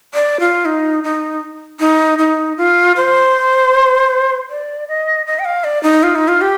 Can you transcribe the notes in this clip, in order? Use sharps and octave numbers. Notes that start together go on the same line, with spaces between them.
D5
F4
D#4
D#4
D#4
D#4
F4
C5
D5
D#5
D#5
G5
F5
D5
D#4
F4
D#4
F4
G4